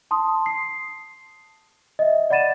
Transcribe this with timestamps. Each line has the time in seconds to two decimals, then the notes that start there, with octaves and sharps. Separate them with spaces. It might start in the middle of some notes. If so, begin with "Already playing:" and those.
0.11 A5 C6 D#6
0.46 C7
1.99 D#5 E5
2.30 D5 F#5 B5 A6 D#7 E7